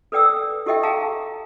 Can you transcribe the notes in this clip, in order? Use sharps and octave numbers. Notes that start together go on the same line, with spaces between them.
A4 B4 D5 G5 D#6 E6
E4 G4 A4 D#5 E5 G5
G#4 D#5 F5 G5 A5 A#5